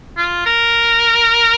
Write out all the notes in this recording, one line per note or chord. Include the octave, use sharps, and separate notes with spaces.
F4
A#4